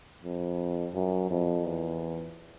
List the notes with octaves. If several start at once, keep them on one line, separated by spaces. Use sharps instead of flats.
F2
F#2
F2
E2